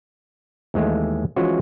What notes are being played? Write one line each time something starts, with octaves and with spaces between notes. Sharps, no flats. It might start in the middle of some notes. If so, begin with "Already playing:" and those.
D#2 E3 G#3 A3
E3 F3 G#3 C#4 F4 F#4